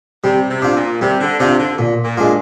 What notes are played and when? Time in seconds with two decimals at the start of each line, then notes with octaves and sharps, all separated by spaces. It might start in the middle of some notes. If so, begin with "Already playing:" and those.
0.24 C3 G3
0.50 C3
0.62 D4 F4
0.76 A#2
1.01 C3 G3
1.20 D3
1.40 C3 D4 F4
1.59 D3
1.79 A#2
2.04 A#2
2.17 G#3 D4 F4